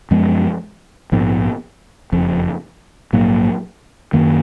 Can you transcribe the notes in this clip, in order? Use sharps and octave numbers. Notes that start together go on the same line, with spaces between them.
F#2 F3 G#3 B3
A#1 G#2 F3 B3
F#1 F2 F3
A#1 G#2 F#3 A#3
F#2 D#3 A#3